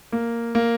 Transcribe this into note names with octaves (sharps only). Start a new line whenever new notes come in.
A#3
A#3